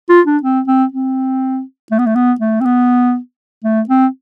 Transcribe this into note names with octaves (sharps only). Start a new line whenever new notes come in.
F4
D4
C4
C4
C4
A3
B3
A3
B3
A3
C4
B3
A3
C4